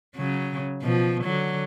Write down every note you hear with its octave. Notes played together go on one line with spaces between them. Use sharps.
C#3 F#3
B2 F3
D3 F#3